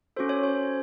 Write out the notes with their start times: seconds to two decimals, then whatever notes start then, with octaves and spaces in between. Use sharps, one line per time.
0.16 C#4 F#4 A4 C5
0.29 C#5
0.43 C5